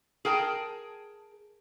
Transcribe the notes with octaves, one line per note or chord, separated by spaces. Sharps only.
G#4 A#4 G5 A5